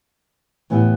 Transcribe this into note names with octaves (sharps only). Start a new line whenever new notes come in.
A2 E3 B3 E4 G4